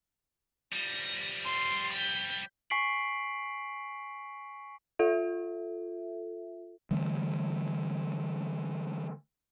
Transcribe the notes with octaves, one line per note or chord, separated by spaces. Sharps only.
F3 G3 A#6
C6
G6 B6
G#5 C#6 B6 C7 D7 F#7
F4 A4 E5
D3 E3 G3 A3